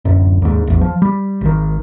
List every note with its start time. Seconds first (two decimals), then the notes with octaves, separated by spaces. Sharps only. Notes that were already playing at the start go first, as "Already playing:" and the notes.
0.05 D1 F#2
0.42 D#2 G#2
0.67 A1 E2
0.81 F3
1.02 G3
1.41 G#1 D#3